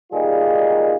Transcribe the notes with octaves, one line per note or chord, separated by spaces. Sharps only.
A#2 D#3 G3 D#4 F4 G#4